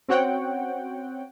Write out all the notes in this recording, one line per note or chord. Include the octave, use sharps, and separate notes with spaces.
C4 C#4 F#4 C#5 F#5 G5